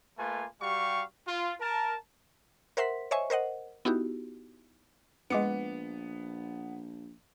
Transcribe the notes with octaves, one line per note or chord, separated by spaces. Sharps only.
A3 A#3 F4 B4 G#5
G3 F#4 G4 F5 C#6
F4
A#4 A5
A#4 C5 E5 F#5 C6 B6
C5 C#5 D#5 E5 G#5 C#6
A#4 C5 D#5 F#5
B3 D#4 E4 F#4 G4
A#1 G#3 B3 D6 C#7